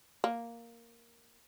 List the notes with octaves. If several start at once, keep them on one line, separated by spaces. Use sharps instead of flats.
A#3